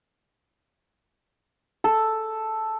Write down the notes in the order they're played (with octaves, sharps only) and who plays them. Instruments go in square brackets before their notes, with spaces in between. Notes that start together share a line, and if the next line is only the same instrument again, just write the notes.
[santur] A4